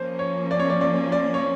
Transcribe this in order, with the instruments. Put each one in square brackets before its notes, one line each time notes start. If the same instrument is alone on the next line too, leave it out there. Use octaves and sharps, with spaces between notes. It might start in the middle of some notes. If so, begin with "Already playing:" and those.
Already playing: [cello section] F3 A#3 C#4 [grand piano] C5
[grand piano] C#5
D5
C#5
D5
D5
D5
C#5